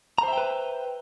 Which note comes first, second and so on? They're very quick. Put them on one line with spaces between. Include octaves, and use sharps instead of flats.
A#5 C5 E5 G5 B4